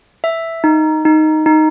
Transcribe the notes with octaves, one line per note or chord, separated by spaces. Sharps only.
E5
D#4
D#4
D#4